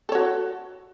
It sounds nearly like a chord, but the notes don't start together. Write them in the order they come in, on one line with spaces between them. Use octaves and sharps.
A4 C#5 F#4